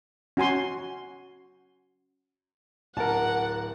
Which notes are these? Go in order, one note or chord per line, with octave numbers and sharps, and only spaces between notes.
C#4 F#4 G#5 C6
D1 A#4 F#5 A5